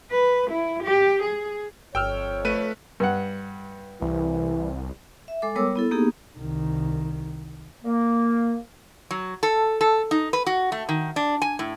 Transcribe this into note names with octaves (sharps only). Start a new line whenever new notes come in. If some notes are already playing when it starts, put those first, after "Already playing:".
B4
E4
G4
G#4
G1 F2 C#5 G5 E6 F6
A3 B4 D#7
G2 F#5
C2 E3
E5
G#3 A4 D6
G3 B3 A#4 C#5 D6 E6
B3 E4 A4
A#3 B3 D#4 G4 G#4
C2 D#3
A#3
F#3
A4
A4
D#4
B4
F#4
A3
D#3
D4
G#5
A2